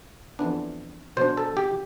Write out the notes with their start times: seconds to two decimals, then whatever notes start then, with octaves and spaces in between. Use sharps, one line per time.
0.39 F2 E3 B3 D4
1.17 B2 B3 D4 C5
1.37 A4
1.57 G4